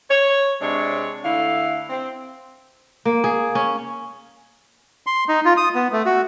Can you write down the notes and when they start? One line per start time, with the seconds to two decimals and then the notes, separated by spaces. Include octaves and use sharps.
0.10 C#5
0.62 C3 G#3 D4 C#5
1.24 D3 A3 E4 F5
1.90 C4
3.05 A#3
3.24 G#4
3.55 C#4
5.07 C6
5.28 D#4
5.45 F4
5.57 D#6
5.75 B3
5.92 A3
6.05 F#4